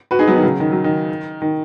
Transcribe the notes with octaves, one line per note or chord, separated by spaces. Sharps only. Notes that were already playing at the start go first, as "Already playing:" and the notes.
F#4 B4
D#4 G#4
F#3 B3
D#3
C#3 F#3
D#3
F#3
D#3
D#3